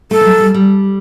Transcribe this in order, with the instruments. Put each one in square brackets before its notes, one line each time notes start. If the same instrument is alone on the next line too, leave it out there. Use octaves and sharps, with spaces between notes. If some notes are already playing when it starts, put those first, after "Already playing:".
[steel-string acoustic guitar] A3 [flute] A4
[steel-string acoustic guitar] E3
F#3
G3
G3